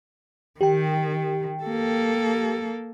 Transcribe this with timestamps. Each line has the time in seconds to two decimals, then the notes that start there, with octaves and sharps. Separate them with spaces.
0.61 D#3 G4 G5
1.64 A#3 A4